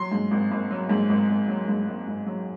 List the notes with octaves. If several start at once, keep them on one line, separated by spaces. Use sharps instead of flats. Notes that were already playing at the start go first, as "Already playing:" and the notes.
Already playing: F#3 C6
G#2
G#1
G#1
F#3
G#2
G#1
G#1
F#3
G#2
G#1
G#1
F#3